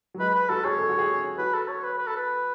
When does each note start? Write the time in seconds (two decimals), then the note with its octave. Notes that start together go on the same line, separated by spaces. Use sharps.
0.14 F#3
0.20 G#3 B4
0.35 B4
0.49 F#4 A4
0.64 G#4 C#5
0.79 A4
0.89 F#4
0.99 G#4
1.38 F#4 B4
1.54 A4
1.68 C#5
1.84 B4
1.98 B4
2.07 A4
2.16 B4